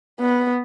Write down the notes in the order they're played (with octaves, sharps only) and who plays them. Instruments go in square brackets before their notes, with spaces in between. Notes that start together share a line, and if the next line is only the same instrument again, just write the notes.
[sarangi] B3